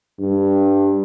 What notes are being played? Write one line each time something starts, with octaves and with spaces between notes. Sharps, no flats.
G2